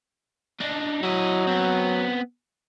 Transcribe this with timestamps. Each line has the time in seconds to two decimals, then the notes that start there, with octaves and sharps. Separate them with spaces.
0.61 D4 D#4
1.03 F#3 E4 D#5
1.47 B3 C4